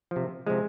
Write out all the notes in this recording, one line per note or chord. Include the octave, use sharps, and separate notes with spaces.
F3
C3
C3 F3 G#3